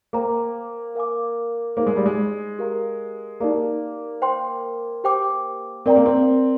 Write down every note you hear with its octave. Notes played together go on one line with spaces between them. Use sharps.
A#3 C5 G5 A#5 D6
A#4 F5 G#5 D6
A#3 D#4 G#4 C5
G#3
G3
G#3
G4 A#4 F5 A#5
A#3 D#4 G4 D5 F5 A#5
C5 G5 C6
G4 C5 G5 D6
C4 A#4 D5 G5 A#5
A#3
C4